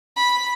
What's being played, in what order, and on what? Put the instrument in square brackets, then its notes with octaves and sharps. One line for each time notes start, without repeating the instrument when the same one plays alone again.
[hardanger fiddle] B5